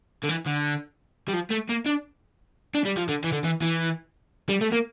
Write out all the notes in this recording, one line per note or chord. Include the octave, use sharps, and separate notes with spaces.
D3
E3
D3
G3
F3
A3
A#3
D4
D4
G3
F3
D3
E3
D3
E3
E3
G3
A3
A#3